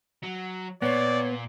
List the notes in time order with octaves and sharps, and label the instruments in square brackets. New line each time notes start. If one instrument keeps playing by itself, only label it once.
[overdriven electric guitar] F#3
[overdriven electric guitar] A#2 [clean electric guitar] B3 [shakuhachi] C#5 [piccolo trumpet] D5